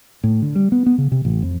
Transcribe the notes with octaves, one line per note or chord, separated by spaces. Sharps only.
A2
D3
G3
B3
B3
C#3
C3
A1
F2